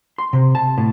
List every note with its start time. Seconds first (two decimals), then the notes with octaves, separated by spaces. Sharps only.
0.18 C6
0.33 C3
0.55 A5
0.78 A2